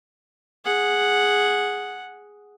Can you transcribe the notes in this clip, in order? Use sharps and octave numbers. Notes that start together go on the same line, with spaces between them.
G#4 F#5